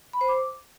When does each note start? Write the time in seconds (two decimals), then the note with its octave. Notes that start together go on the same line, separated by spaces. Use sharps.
0.13 B5
0.21 C5
0.28 D6